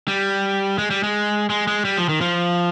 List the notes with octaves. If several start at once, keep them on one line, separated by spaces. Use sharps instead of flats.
G3
G#3
G3
G#3
G#3
G#3
G3
F3
D#3
F3